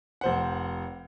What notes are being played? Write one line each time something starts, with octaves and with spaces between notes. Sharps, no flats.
F1 C5 F#5